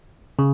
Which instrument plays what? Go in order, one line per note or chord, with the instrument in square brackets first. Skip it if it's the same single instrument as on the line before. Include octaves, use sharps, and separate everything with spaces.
[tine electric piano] C#3